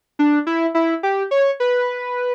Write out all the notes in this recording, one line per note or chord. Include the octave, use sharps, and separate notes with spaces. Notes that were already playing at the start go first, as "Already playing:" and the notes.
D4
E4
E4
G4
C#5
B4